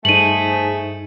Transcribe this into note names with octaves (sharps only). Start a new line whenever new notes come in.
G2 A3 D#4 G#4 C5 G#5 D#7 F#7